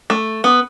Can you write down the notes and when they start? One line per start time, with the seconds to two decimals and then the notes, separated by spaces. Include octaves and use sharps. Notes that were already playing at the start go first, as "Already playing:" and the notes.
0.10 A3
0.44 B3